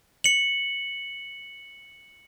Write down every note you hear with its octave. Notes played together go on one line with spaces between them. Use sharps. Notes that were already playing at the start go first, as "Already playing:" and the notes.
C#7 F#7